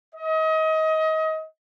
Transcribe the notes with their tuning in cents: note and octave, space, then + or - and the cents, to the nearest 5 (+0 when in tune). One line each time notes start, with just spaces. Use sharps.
D#5 +30